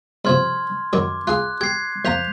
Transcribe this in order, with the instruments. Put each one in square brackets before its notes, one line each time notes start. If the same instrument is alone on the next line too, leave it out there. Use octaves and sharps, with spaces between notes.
[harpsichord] G2 C3 F3 [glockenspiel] C6 F6 G#6
[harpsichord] F#2 D#3 F#3 [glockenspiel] D6
[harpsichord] F4 G#4 C6 [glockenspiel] F#6
[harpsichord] G4 [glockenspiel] G#6 C7
[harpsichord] F2 F4 A#5 [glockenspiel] G6 B6 F7